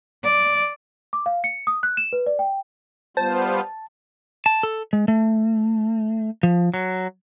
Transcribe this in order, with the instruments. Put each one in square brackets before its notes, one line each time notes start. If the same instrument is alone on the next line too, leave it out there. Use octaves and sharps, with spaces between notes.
[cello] D5
[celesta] D6
F5
C#7
D#6
F#6
E7
B4
D5
G5
[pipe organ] G3 B3 F4 [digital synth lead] C5 [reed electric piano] A5
[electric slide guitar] A5
A4
G#3
A3
F3
F#3